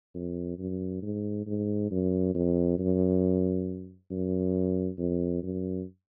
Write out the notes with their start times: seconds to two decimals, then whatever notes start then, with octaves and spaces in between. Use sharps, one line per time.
0.15 F2
0.59 F#2
1.03 G#2
1.47 G#2
1.91 F#2
2.35 F2
2.79 F#2
4.11 F#2
4.99 F2
5.43 F#2